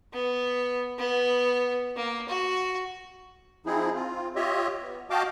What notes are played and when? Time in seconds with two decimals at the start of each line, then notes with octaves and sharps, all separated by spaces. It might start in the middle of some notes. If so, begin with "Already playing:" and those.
0.13 B3
0.98 B3
1.96 A#3
2.28 F#4
3.66 F3 C4 D#4 E4 G#4
3.95 C4 F4
4.36 F4 G4 C#5 D#5 E5
4.82 B3
5.10 F#4 D#5 F5 G5 A5 D6